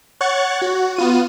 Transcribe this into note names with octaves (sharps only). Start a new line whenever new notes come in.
C#5 F#5 C#6 F#6 A6
F#4
B3 F4 D#7